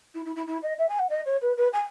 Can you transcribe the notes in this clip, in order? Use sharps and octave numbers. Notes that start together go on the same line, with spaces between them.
E4
E4
E4
E4
D#5
E5
G#5
F#5
D#5
C#5
B4
B4
G#5